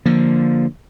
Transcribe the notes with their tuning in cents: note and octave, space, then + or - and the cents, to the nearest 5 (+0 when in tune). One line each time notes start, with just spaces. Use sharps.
D3 +0 F3 +0 A#3 +0